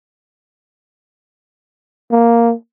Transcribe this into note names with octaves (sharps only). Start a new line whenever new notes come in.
A#3